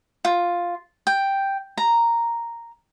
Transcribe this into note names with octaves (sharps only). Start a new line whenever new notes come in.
F4
G5
A#5